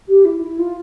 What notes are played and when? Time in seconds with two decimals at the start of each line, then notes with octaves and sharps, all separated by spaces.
0.09 G4
0.25 E4
0.42 E4
0.59 F4